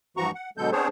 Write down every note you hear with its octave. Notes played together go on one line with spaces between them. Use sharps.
G2 E3 F3 F#4 A#5 C#6
F#5
B2 D3 F#3 G#3 A4 G6
B3 C4 D4 G#4 C5 C#5